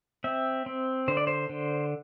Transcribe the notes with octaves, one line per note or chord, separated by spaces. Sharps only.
C4 E5
C4
D3 C5
D5
C5
D3